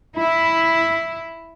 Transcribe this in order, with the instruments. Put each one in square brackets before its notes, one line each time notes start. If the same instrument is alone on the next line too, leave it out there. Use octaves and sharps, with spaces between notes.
[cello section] E4